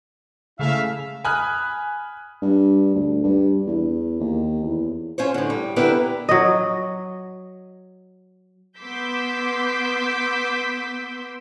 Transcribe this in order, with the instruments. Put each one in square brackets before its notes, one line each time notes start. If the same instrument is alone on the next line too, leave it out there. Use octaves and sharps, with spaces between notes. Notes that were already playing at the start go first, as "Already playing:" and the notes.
[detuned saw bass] C#3 [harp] G#3 A3 [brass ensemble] E4 E5 F5
[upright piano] G#5 B5 D#6 F6 F#6
[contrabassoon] G2
D2
G2
E2
D#2
E2
[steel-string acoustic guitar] C#4 F4 C5 C#5
A2 D3
G3
D3 B3 E4 G4 A#4 B4
[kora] F#3 D#5
[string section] B3 C6 D6 E6 G6 B6